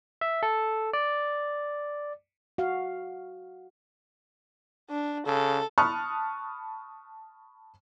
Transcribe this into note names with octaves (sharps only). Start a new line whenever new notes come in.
E5
A4
D5
F#4 F5
D4
C#3 A4
A5 B5 C#6 D#6 F6 F#6